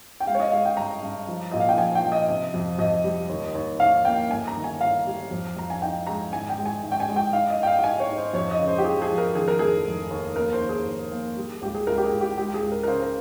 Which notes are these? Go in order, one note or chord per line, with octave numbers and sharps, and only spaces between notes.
G5
G#3 F5
C#5
D#5
G#3 F5
G5
G2 A#5
G2
F3
A#2 D#5
F5
G5
F3 G#5
G5
F3
D#5
C3
F2
F2 D#5
G3
D#2
D#2
D#2 F5
A#3 G5
G1 G#5
A#5
D#3
G#5
G1 F5
G3
F2
F2 A#5
G#5
D#4 G5
G#3 A#5
G#1 G#5
G5
G#3
G#5
G#1
G5
G#5
G#3
G5
D#4 F5
D#5
D#4 G5
F5
G5
D#4 G#5
C#5
D#4
C5
F2 C#5
D#5
C#3
C5
G4
F3 G#4
G#4
F3
A#4
D#3 G#4
A#4
F1 G#4
F1
D#2
A#3 A#4
C5
D#2
G#4
D#2
A#3
G3
C#2 G4
G#4
C#2 A#4
G4
G#4
C#2
G4
G#3 G4
G#4
C#2
A#4
A#4
C#3 C5
A#4